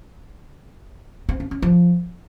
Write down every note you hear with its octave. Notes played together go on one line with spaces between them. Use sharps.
C4
C#4
C#4
F3